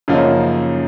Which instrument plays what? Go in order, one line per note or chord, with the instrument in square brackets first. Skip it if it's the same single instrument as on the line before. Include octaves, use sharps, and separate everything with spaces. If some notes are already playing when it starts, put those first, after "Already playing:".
[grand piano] F#2 C#3 F3 A#3 D#4